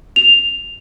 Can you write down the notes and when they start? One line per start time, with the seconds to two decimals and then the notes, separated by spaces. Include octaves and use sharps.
0.16 F7